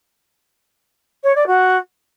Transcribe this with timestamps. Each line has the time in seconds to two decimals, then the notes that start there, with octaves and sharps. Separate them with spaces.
1.23 C#5
1.35 D5
1.47 F#4